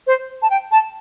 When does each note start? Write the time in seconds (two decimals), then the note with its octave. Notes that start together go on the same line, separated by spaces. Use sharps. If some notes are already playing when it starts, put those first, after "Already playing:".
0.07 C5
0.42 A5
0.50 G5
0.71 A5